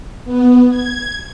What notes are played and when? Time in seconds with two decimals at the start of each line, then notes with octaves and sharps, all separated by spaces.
0.25 B3
0.70 G#6